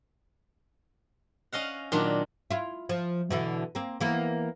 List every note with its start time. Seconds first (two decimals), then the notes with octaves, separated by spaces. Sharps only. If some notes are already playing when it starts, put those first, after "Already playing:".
1.52 C#4 D#5 F5 F#5
1.92 A#2 D#3 F#3 D4
2.51 E4 F4
2.89 F3
3.30 B2 D3 E3
3.75 A#3 C4
4.01 E3 A#3 B3